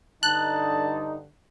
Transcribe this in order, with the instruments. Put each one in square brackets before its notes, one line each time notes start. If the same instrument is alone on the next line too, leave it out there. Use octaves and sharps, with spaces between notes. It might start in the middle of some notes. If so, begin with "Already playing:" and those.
[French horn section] G2 D3 [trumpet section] D#4 [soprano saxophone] A5 [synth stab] F#6